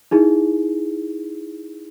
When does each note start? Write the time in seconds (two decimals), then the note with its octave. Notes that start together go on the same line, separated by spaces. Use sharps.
0.11 D#4 E4 G#4